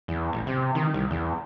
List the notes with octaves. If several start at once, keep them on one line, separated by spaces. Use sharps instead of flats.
E2
A1
C3
D#3
C2
E2